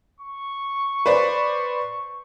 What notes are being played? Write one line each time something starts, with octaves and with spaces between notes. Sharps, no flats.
C#6
B4 C5 D5